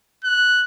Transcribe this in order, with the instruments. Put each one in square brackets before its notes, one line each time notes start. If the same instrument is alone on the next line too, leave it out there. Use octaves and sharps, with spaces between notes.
[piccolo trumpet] F#6